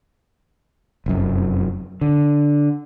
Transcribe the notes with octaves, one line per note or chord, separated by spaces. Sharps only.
F1 F#2
D3